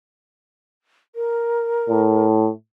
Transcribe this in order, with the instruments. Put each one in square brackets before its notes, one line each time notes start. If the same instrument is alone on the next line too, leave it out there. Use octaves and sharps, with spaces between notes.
[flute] A#4
[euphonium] A2